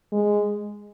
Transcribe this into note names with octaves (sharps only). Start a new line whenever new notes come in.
G#3